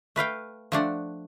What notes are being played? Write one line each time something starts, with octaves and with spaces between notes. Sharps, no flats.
A3 B4 F5 G5
F3 A3 D4 F#5